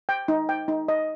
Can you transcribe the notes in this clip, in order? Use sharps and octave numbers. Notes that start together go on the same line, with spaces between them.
G5
D#4
G5
D#4
D#5